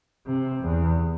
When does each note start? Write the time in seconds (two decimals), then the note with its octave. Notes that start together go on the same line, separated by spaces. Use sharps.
0.26 C3
0.63 E2